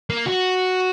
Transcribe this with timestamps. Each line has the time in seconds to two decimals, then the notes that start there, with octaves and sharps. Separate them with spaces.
0.10 A#3
0.26 F#4